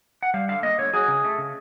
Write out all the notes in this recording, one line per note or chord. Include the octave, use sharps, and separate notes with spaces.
F#5
G3 F5
D3 F5
A#3 D#5
D3 C#5
F#3 G#4
C#3
A3
C#3